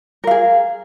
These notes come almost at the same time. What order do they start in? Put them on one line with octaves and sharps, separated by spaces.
A#4 F5 G#4